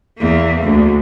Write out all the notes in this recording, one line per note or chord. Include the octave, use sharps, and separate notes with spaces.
E2 A#3
D2